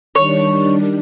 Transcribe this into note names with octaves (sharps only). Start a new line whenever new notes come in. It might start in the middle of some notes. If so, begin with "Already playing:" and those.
D#3 G3 D4 C#5